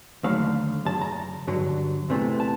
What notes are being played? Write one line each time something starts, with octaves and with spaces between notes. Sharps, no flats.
D#2 D3 F#3 A3 F5
F#2 C#3 A5
A#5
G2 D3 F#3
E2 C3 E3 A3
A5